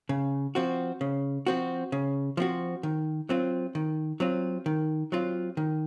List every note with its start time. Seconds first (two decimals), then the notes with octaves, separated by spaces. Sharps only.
0.09 C#3
0.55 F3 C4 F#4
1.01 C#3
1.47 F3 C4 F#4
1.92 C#3
2.37 F3 C4 F#4
2.83 D#3
3.29 F#3 C4 F4
3.75 D#3
4.20 F#3 C4 F4
4.66 D#3
5.12 F#3 C4 F4
5.57 D#3